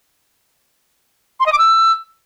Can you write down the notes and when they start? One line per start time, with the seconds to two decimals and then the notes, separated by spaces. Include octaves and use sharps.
1.40 C6
1.46 D#5
1.52 D6
1.58 E6